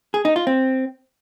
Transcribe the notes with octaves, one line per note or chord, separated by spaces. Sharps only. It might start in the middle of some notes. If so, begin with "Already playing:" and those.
G#4
D#4
F4
C4